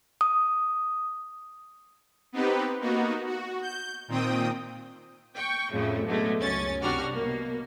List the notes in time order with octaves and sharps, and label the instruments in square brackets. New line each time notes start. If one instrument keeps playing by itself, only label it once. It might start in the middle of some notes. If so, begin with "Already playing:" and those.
[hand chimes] D#6
[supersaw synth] B3 C4 D#4 G4 B4
A#3 B3 D#4 F#4
F#4
G6
A#2 D#3 C4 G5 D#6
[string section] G5 C#6
F2 A2 C#3 A3
B2 D3 F#3 G#3 A3
C#2 F#2 C#4 A6
C2 G3 D4 F#4 F6
B2 A#3